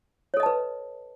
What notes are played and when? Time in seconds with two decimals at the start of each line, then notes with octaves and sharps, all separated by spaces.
0.34 C#5
0.37 A4
0.40 D#5
0.43 A5
0.46 B4